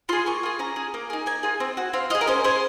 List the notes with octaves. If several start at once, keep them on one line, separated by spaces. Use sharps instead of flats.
F4 G#4 C6
A#3 C#6
F4 G#4
C#4 A#5
G#4
A#3
D#4 G#4
A#3 G#5
F4 G#4
C4
F#4
C4 F5
F4 G#4 D#5
A#4
C#4 C5
G#4 C5